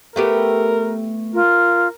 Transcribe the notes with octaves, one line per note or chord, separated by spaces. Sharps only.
A3 B3 G4 A#4
F4 A#4